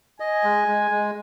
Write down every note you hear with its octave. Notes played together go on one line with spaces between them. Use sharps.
D#5 G#5
G#3
G#3
G#3